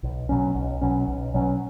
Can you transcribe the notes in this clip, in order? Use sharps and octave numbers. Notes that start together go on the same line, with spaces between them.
B1
B2 F#3 C#4
B1
B2 F#3 C#4
B1
B2 F#3 C#4